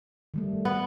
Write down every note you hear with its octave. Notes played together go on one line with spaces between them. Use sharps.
D#3 G3 A3
B3